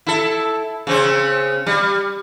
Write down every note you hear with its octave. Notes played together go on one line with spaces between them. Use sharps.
E4 A4
C#3 C4 C#4
G3